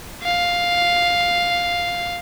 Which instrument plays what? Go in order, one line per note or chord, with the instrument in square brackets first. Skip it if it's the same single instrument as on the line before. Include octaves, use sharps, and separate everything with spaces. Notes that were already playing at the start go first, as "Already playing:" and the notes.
[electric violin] F5